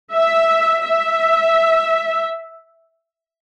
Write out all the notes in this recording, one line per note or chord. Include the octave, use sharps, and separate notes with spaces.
E5
E5